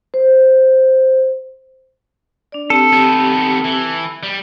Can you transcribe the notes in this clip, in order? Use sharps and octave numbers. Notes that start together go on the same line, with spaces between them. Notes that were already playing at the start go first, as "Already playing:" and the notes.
C5
D4 D5
C4 G4 A4
D#3 B3
E3
G3